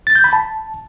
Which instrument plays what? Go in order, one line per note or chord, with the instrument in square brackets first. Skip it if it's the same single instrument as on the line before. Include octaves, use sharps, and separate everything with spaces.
[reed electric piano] A6
G6
B5
A5